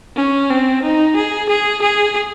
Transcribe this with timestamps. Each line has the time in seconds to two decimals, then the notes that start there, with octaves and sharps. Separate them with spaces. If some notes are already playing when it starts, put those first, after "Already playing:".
0.16 C#4
0.50 C4
0.83 D#4
1.16 G#4
1.49 G#4
1.82 G#4